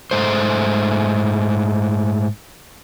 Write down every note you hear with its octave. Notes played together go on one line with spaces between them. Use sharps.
G#2 A3 C5